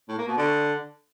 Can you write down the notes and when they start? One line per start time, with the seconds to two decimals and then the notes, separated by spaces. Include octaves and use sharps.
0.09 A2
0.18 A#3
0.27 B2
0.37 D3